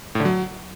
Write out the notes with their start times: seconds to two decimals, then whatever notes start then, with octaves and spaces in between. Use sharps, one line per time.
0.15 A2
0.20 D3
0.25 F#3